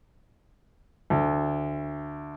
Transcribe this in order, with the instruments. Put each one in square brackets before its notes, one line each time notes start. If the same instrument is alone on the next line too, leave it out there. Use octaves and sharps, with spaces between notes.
[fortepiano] D2